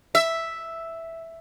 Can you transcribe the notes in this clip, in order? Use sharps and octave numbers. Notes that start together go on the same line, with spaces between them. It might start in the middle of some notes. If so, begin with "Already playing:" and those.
E5